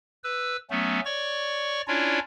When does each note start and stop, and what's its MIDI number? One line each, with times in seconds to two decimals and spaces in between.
0.24 0.57 71
0.24 0.57 88
0.70 1.00 54
0.70 1.00 57
0.70 1.00 59
0.70 1.00 61
1.05 1.81 73
1.05 1.81 74
1.05 1.81 85
1.88 2.19 61
1.88 2.19 62
1.88 2.19 64
1.88 2.19 65
1.88 2.19 73
1.88 2.19 74